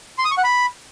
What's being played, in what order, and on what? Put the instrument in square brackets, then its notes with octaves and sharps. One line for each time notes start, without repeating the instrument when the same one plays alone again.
[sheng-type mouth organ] C6
D#6
C#6
F#5
B5